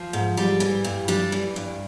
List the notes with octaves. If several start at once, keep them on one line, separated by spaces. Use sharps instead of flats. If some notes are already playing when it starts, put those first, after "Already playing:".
Already playing: F3
G#2
G3
E3
G2
G3 D4
E3
G2